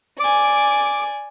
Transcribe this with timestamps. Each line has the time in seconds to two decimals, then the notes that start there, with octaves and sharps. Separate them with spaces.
0.20 D5 G#5 D6